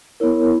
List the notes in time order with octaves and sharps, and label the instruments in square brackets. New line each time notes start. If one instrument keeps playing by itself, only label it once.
[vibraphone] B3 E4 A#4 C#5